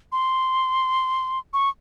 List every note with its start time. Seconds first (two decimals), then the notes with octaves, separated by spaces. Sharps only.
0.12 C6
1.53 C#6